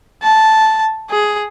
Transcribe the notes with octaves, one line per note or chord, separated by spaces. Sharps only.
A5
G#4